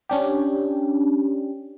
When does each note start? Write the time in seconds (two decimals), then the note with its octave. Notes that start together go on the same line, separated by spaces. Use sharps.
0.09 C#4 D4 G4